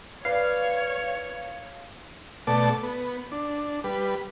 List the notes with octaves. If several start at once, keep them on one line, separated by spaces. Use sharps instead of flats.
B4 C#5 D5 F5
B2 A3 D5 A5
B3
D4
G3 B4